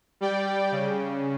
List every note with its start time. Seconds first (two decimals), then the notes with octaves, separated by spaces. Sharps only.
0.21 G3 D5 G5
0.72 C#3